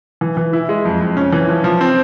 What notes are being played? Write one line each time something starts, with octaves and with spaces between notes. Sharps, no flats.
E3
E3
E4
G#3
F2
F2
C#4
E3
F3
F3
C4